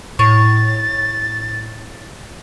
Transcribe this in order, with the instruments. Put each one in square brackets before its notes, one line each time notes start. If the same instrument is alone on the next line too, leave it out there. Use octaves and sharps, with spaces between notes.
[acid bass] A2 [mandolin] C#5 [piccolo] A6